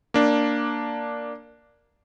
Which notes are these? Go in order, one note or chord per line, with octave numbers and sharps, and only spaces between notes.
A#3 D4